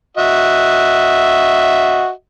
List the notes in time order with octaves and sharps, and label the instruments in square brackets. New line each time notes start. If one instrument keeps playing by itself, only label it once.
[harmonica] F#4 D#5 E5